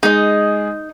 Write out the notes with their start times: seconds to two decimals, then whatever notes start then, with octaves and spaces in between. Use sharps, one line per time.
0.03 G#3 D#4 G#4 D#5